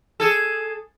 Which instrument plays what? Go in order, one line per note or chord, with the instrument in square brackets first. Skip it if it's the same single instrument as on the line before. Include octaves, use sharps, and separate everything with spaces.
[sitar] G#4 A4